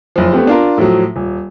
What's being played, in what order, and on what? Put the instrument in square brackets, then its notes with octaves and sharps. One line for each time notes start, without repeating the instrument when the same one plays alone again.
[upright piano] F#1 F3
A3 B3 C4 G4
D4 F4 A#4
A2 F3 F#3
D#1